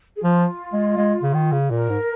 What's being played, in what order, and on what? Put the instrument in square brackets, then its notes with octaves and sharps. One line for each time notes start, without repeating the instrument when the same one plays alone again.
[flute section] G#4
[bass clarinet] F3 [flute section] F4
[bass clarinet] G#3
G#3
C#3
D#3
C#3
[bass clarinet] A#2 [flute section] A#4
[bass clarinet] G#2